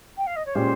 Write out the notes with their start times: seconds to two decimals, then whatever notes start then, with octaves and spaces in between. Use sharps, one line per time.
0.18 G5
0.27 F5
0.36 D#5
0.46 C#5
0.55 A#2 G#3 C#4 G4 C5